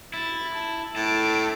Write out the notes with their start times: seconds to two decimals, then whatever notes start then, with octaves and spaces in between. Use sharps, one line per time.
0.14 E4 A6
0.55 A5
0.96 A2 E5 A5 D7